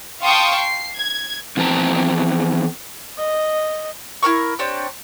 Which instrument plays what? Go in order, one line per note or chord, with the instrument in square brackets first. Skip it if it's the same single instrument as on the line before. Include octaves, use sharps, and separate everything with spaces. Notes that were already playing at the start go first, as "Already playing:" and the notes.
[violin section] F5 G5 A5 C6 C#6 D#6
C7
G#6
[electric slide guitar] E2 E3 F3 C4 A5 A#5
[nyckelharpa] D#5
[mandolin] E4 F#4 A#4 C#6
C4 D4 G4 C#5